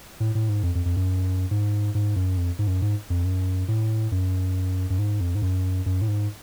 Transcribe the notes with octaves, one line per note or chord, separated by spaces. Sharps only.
A2
A2
G#2
F2
F2
F2
F#2
G#2
G#2
F#2
F2
G#2
F#2
G#2
F2
F#2
A2
F#2
F#2
G#2
F2
G#2
F#2
F#2
A2
G#2